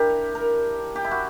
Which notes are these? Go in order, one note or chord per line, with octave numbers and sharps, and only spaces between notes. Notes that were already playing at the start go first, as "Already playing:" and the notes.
Already playing: D4 E4 G4 A#4
A#4
G4
E4
F#4